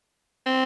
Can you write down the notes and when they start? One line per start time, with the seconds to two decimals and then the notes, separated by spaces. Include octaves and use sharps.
0.46 C4